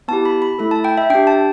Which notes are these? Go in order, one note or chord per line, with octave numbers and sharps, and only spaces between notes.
B3 E4 G4 A5
B5
B5
A3 E4 A4 B5
A5
G5
E5
D4 G4 G5
A5